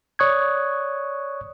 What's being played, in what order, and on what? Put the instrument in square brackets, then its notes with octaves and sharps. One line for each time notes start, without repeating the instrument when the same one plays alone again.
[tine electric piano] C#5 D5 C#6 D#6 F#6 G#6